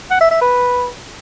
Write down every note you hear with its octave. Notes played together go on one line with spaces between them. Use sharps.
F#5
E5
E5
B4